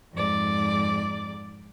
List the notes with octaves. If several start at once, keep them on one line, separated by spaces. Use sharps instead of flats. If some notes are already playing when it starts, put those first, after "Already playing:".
F2 G#2 D5